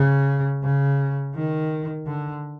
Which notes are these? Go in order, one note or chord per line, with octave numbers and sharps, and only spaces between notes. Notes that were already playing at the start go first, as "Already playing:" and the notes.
Already playing: C#3
C#3
D#3
D3